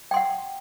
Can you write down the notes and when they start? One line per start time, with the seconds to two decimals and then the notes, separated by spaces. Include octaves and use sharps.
0.11 G5
0.14 C6
0.16 F#5